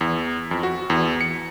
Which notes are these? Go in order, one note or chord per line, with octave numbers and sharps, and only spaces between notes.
E2
F2
F#4
E2
C#7